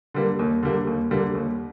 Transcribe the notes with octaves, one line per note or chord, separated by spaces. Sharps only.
D3 G3 A#3
D#2
D3 G3 A#3
D#2
D3 G3 A#3
D#2